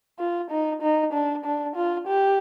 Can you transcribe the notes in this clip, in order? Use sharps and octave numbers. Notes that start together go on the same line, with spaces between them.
F4
D#4
D#4
D4
D4
F4
G4